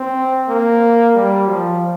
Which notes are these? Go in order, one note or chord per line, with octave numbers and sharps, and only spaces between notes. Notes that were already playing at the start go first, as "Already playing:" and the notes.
Already playing: C4
A#3
G3
F3